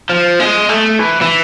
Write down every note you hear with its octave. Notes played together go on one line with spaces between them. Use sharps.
F3
G#3
A3
E3
E3